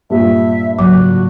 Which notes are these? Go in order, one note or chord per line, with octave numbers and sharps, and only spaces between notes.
G2 A#2 E5
G#1 C#3 F#3 F#4